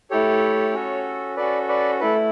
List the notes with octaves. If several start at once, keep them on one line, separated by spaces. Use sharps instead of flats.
A3 E4 G4 A4 C#5
C#4 F#4 A4
C#4 F#4 A4 B4 D5
B4 D5
A3 E4 A4 B4